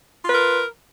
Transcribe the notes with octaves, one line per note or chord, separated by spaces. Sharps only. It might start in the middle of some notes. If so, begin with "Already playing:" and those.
F4 A#4 B4